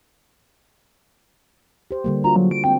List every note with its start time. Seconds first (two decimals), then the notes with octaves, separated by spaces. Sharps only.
1.91 G4 C5
2.04 D3 G3 A#3
2.24 D4 F4 F#4 A#5
2.36 F#3
2.51 D7
2.64 G#3 C4 G5